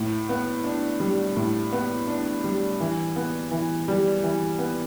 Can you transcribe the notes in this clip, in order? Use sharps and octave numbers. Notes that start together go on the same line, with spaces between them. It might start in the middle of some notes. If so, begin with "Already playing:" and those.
Already playing: A2
B3
D4
G3
A2
B3
D4
G3
E3
B3
E3
G3
E3
B3